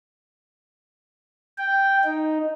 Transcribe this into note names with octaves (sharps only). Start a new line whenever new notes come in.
G5
D#4